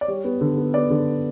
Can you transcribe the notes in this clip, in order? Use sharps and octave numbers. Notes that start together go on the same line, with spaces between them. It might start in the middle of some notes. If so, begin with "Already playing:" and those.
D5
G3 C#5
B3
D3
B3
B3 D5
D3